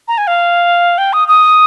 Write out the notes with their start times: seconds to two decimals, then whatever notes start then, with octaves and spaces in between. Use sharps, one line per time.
0.08 A#5
0.18 G#5
0.27 F5
0.98 G5
1.13 D#6
1.28 D#6